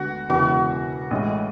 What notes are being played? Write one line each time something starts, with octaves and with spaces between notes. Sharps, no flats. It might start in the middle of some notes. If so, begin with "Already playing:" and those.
Already playing: D2 D3 G#3 B3 F#4
E1 E2 C#3 E3 F#4
A1 A2 G#3